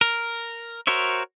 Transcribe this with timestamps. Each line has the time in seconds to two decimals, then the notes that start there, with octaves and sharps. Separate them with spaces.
0.01 A#4
0.87 F#4 A#4 C5 C#5 E5